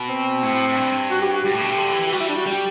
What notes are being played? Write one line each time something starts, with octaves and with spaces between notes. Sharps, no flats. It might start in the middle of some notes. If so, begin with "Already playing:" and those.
Already playing: B2
C4
A2
A2
G2
F#4
G4
F#4
G2 G4
A2
B2
C3
D3
E3
E3
G4
G3 F#4
E4
D4
F#4
G3 G4